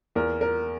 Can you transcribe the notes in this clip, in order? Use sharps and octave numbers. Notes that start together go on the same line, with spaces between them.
E2 A#4
A#4